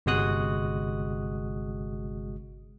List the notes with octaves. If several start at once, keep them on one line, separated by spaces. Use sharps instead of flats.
G1 C3 G#3 F#4 D#6 F#6